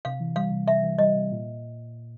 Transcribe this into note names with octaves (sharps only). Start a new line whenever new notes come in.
C3 F5
E3
G3 F5
C3
C3 E5
E3
G3 D#5
C3
A#2